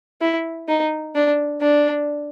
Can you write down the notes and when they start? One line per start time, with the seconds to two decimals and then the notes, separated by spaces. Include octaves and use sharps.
0.21 E4
0.68 D#4
1.15 D4
1.61 D4